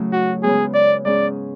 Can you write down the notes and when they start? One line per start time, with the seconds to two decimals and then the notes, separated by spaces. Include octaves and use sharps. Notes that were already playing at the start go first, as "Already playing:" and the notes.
Already playing: A2 C#3 F#3 A3 C#4 E4
0.13 F#4
0.43 C#3 G#3 B3 G#4
0.75 D5
1.05 G#2 G#3 C#4 G#4 D5